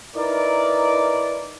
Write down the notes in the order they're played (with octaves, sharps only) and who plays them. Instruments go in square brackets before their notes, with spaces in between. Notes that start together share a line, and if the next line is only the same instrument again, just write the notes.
[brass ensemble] D#4 E4 A#4 B4 D5